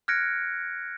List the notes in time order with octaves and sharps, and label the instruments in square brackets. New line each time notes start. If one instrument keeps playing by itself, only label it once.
[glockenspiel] F6 F#6 G#6 A#6 C#7 D7